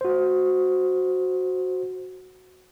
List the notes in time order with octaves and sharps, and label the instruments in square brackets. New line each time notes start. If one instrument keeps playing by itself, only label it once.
[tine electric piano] F#4 C5